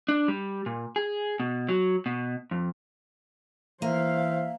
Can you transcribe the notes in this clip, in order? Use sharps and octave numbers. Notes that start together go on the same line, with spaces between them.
D4
G3
A#2
G#4
B2
F#3
B2
F2
E3 A#3 C5 E5 F5